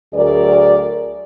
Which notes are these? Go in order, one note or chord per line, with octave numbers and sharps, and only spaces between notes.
D2 F#3 G#4 A#4 D5